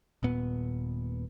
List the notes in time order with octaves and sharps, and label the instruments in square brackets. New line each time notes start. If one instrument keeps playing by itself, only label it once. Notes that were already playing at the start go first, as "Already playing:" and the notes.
[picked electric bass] D#1 A#2 B3